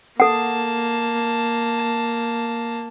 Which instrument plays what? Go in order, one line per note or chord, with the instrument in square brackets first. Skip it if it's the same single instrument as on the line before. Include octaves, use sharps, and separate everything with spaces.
[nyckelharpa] A#3 A5 [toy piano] A4 F#5